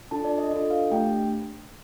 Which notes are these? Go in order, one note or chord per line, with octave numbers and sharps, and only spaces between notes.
D4 F4 A4 A5
D5
D#5
D4 F4 A4 D#5
F5
A3 D4 G4 G5